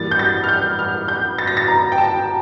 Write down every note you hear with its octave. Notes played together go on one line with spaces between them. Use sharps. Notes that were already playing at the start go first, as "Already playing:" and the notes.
Already playing: G2 E3 A#3 A6
G6
A6
F6
G6
F6
G6
A6
A#6
A6
A#5
G5
A5